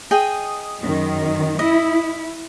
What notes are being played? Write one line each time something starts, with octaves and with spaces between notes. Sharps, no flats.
G#4 D#5 G5
F#2 D#3
E4 D#5